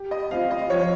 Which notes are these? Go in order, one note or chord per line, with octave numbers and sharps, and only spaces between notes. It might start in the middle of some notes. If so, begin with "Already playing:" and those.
Already playing: G4
D#5
C4 F4 F5
D#5
F3 C#5